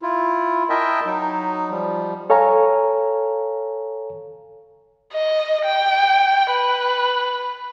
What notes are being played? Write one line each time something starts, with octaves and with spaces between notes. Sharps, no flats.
E4 F4
E4 A#4 D#5 E5 G5 A5
F#3 D#4
F3 G3
A4 C#5 F5 G#5 A#5
D#5
G5
B4